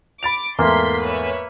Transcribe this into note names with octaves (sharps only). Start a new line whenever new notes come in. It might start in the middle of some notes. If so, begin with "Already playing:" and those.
B5 D6 A6 F7
E2 G#2 A3 A#3 C6 B6
B4 C#5 E5